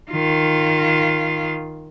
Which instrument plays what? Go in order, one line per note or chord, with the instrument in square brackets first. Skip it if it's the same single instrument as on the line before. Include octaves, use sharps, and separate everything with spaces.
[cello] D#3 F4